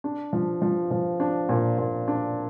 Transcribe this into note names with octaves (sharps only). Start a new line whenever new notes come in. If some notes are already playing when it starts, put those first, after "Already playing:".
D4
F3
F3
F3
D4
A#2
A#2
D4